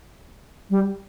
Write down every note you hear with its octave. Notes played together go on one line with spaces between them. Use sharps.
G3